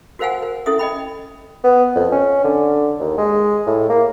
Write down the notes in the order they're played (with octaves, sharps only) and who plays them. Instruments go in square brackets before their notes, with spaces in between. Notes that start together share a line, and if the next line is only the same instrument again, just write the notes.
[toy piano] F#4 A#4 C5 F5 F#5 G#5
A#4
C#4 E4 A4 E5 D#6
D#5 G5 B5
[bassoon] B3
F2
C#4
D3
D#2
G#3
A2
A#3